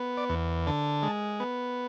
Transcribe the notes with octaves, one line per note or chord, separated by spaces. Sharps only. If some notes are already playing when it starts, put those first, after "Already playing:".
Already playing: B3
D5
E2
D3 A5
G#3
B3